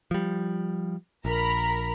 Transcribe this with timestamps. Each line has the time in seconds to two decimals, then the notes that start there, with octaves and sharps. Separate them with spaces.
0.11 F3 G3
1.25 A#1 A#4 A#5 B5